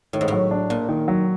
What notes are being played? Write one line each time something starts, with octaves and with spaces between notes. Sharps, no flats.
A2 D#3
G#2
A2 F#3
D4
A#2 A#3
D#3
F#3